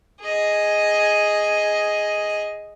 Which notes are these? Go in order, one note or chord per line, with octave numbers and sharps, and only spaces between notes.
G#4 D#5